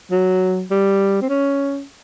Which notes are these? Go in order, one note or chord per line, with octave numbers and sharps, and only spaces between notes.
F#3
G3
C4
C#4